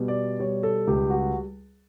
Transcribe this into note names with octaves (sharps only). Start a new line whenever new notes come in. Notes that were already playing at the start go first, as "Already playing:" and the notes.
Already playing: B2 G3
D5
G3 C#5
A4
C#2 G4
F#4